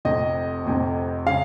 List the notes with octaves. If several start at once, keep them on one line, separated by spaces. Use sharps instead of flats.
F1 F2 C3 D#5
F1 F2 C3
C#3 G#3 F5